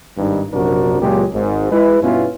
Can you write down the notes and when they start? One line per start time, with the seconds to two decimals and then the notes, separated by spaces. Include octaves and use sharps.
0.17 G#1 G2 D#4
0.53 A#1 F#2 C3 D4 F#4 A#4
1.00 C#2 A#2 F#3 G#3 G4
1.32 G#1 G#2
1.71 G#3 E4 B4
2.02 G2 B2 B3 C#4 E4 F4